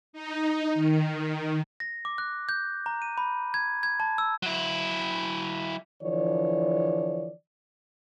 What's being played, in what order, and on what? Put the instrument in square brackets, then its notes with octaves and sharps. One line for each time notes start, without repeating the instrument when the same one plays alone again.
[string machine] D#4
D#3
[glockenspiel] A#6
D6
F#6
G6
A#5
D#7
B5
G#6
G#6
A5
E6
[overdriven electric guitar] F#3 E4
[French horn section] D3 E3 F3 C#5 D5